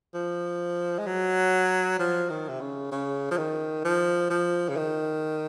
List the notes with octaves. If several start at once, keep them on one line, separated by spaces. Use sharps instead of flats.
F3
G#3
F#3
F3
D#3
C3
C#3
C#3
F3
D#3
F3
F3
C#3
D#3